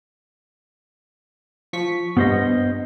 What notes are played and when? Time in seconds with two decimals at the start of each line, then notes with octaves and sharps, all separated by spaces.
1.73 F3 C#6 B6
2.17 G2 B3 C5 D#5